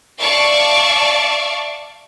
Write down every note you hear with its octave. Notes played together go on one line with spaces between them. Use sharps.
D5 E5 F5 A5 C#6 D6